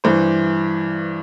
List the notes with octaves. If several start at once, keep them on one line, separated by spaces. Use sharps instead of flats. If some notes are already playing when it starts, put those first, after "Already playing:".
G2 E3 C5